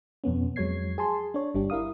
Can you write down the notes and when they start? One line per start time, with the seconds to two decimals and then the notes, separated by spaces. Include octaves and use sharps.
0.24 F2 B2 B3 C#4
0.56 F2 F#3 G#3 C#5 G#6 C7
0.98 G#4 G#5 A5 C6
1.34 D4 C#5
1.55 G1 G3 D4 G4
1.70 E4 A#4 F5 D#6